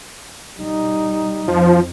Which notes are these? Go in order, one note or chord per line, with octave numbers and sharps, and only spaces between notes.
G3 D#4
F2 F3